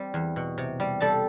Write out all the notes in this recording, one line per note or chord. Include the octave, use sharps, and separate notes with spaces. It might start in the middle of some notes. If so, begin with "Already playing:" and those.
Already playing: G3 C4
E2
B2
C3
G3
G3 A4 A5